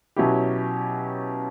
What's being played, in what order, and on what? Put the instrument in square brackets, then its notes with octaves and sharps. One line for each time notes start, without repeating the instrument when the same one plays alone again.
[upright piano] B2 F#3 C#4 E4 G4